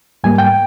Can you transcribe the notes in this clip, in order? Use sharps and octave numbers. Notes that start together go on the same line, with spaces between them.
G#2 G3 A#3 G#5
G5